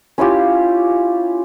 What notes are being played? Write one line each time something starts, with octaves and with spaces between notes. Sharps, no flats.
C#4 E4 F4 G4